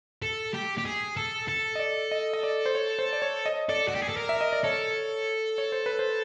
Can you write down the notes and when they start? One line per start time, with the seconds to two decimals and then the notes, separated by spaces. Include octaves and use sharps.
0.22 A4
0.54 G4
0.78 G4
0.85 G#4
1.17 A4
1.48 A4
1.75 D#5
1.80 D5
2.12 D#5
2.33 D#5
2.43 D5
2.66 C5
2.75 C#5
2.99 C5
3.13 D5
3.22 C#5
3.46 D#5
3.69 A4 D5
3.88 F#4
3.95 G4
4.02 G#4
4.09 A4
4.17 A#4
4.29 E5
4.41 D#5
4.53 D5
4.64 A4 C#5
5.58 C#5
5.72 C5
5.86 B4
5.99 C5